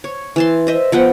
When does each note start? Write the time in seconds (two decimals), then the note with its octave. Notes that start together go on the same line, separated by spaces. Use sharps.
0.04 C#5
0.36 E3 A5 C6
0.67 C5 D#5 E5
0.92 F3 B3 F#5 G5